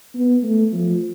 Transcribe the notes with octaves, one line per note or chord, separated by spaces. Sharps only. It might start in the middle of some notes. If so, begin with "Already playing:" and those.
B3
A3
F3